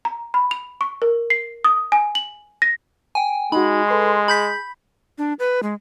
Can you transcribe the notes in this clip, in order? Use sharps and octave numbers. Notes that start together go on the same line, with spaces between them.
A#5
B5
F7
C#6
A#4
C7
D#6
G#5
F#7
A#6
G5 G#5
G#3 D#4 F#4 B5
A4 B4 C6
G#4 B5 G6 B6
D4
B4
G#3